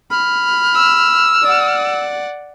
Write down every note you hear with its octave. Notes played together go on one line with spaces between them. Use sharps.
B5 F6
E6
D5 F#5